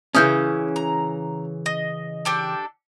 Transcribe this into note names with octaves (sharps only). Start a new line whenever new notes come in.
C#3 E3 C#4 D#6 F6 G6
A#5
D#5
D4 G4 A4